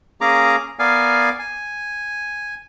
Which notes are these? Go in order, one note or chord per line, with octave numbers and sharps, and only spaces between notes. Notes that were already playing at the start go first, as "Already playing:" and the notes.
A#3 C#4 G#4 A#5 D6
B3 A#4 D5 F5 G#5
G#5